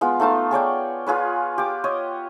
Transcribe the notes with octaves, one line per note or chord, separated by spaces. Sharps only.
G#3 B3 F4
A3 D#4 F4 A5
G#4 C#5 D5 G5
F4 G#4 B4 C#5
G4 D6
C#5 D#5